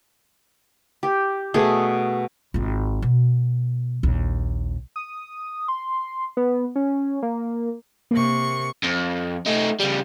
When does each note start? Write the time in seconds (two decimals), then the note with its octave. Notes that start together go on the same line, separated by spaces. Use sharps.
1.03 G4
1.54 B2 A3 G#4
2.54 G#1 F4
3.02 B2
4.03 A#1 D#2
4.96 D#6
5.68 C6
6.37 B3
6.76 C#4
7.22 A#3
8.11 C3 A#3 C#6
8.84 F2
9.46 A3 D#4
9.80 C#3 G3